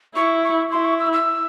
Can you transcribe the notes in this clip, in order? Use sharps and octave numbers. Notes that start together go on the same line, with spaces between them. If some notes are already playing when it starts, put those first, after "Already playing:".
E4 C#6
C#6
E4 C6
C#6
E6
E6